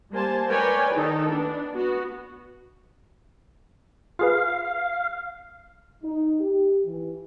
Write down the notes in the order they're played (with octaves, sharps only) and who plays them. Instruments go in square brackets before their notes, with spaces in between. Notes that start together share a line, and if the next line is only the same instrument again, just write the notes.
[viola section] G3 A#3 C5 G#5 A5
A#4 B4 C#5 D5 G5 G#5
D#3 D#4 A4
B3 D4
B3 F#4
[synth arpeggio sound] F4 G#4 B4 [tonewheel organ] F5
[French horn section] D#4
G4
E3